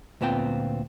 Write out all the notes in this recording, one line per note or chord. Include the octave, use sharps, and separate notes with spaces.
D2 A#2 B3 C4 F4 G5